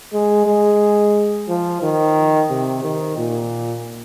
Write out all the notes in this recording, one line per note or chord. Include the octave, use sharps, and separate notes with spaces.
G#3
G#3
F3
D#3
C3
D#3
A#2